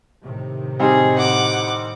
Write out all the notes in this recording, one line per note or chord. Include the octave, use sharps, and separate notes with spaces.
A2 C3 D#3
G3 C4 D#4 G#4
F#5 D6